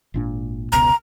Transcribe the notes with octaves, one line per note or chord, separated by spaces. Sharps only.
G#1 A#2 D4
F1 C#2 B2 A#5